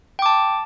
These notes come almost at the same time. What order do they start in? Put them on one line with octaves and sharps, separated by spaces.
G5 D6 A5